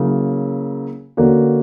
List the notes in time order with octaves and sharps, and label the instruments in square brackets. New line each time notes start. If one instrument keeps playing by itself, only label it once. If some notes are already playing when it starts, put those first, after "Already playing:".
Already playing: [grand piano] C#3 F#3 A#3 E4
D3 A#3 C#4 F#4